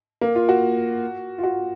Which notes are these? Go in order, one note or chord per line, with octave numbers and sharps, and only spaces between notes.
A#3
F4
F#4
F4
F#4